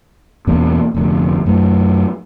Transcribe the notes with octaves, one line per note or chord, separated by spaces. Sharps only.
E2 B2 A#3 C#4
F1 D2
F#2 A3